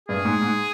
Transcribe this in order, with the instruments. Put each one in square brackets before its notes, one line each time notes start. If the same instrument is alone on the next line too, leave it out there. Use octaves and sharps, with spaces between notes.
[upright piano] G2 [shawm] G#4
[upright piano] G#2
G#2